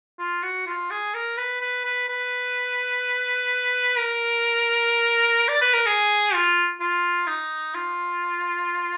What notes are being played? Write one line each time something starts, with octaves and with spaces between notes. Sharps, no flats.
F4
F#4
F4
G#4
A#4
B4
B4
B4
B4
A#4
D5
B4
A#4
G#4
F4
F4
D#4
F4